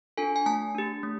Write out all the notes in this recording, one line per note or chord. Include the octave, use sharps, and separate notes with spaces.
D4 F4 A4 G#5
G#5
A3 A5
D4 G4
A3